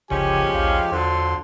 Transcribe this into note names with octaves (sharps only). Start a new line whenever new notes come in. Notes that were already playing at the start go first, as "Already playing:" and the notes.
F#1 C#2 C#3 F3 G#3 C#4 G4 G#5
A#1 D#2 F5
E2 D3 F3 F#3 C6